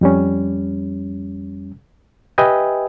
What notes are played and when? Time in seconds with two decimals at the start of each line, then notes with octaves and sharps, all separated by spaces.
0.01 F2 G3 C#4
2.38 G4 B4 D#5 E5 G5 G#5